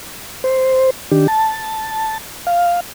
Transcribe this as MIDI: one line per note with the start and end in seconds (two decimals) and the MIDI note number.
0.44 0.90 72
1.11 1.27 51
1.11 1.27 62
1.11 1.27 67
1.28 2.18 81
2.47 2.80 77